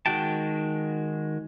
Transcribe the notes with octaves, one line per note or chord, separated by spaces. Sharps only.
D#3 G#3 F#4 G5 A5